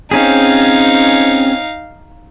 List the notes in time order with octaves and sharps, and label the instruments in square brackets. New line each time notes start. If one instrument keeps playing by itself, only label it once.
[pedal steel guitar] C4 C#4 G#4 [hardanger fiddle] D#4 F5